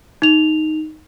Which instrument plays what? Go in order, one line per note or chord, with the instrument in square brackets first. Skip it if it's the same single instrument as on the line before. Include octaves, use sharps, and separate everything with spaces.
[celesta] D#4 F7